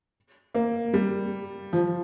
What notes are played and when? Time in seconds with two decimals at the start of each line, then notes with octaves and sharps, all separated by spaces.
0.55 A#3
0.94 G3
1.73 F3